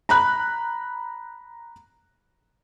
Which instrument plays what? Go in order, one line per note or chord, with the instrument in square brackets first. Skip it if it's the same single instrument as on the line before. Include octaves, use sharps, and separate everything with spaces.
[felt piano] A#5 B5 F#6